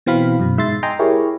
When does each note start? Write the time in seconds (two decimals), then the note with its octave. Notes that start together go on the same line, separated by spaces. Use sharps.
0.06 B2 E3 C4 F5 B5
0.39 F#2 B2
0.58 G#2 E5 C6 A6
0.83 D#5 G5 G#5 A#5 C6
0.99 E4 G4 G#4 A#4 C#5